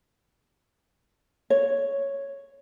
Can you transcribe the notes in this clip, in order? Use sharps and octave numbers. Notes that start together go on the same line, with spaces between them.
C#5